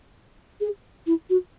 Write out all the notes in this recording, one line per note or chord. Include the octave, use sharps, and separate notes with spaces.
G#4
E4
F#4